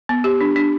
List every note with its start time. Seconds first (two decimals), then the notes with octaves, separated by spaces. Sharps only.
0.09 B3
0.24 G4
0.41 D4
0.56 D4